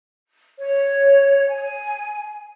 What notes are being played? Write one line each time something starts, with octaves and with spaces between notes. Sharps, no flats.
C#5
G#5